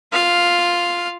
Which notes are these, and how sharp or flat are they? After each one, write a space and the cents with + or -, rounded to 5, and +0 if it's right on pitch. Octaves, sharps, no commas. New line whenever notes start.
F4 +0 F5 +0